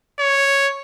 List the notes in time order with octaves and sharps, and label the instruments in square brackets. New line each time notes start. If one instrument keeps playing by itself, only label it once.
[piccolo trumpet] C#5